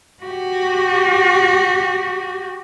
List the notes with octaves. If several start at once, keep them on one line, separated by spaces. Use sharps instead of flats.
F#4 G4